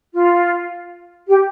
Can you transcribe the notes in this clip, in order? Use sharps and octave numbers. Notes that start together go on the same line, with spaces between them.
F4
G4